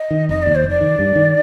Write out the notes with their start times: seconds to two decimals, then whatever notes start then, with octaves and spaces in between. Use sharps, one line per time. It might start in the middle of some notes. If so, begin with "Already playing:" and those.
Already playing: D#5
0.11 D#3
0.29 F1 D#5
0.42 D#2 D5
0.55 C5
0.64 F1
0.69 D5
0.81 D#3
0.99 G2
1.16 D#3